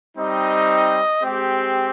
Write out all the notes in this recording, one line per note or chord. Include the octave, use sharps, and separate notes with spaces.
G3 C4 D#4 D#5
G#3 C4 G4